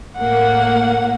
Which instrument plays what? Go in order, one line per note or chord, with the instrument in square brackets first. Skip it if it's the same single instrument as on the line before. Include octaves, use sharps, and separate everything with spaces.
[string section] A2 A#3 [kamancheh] F#5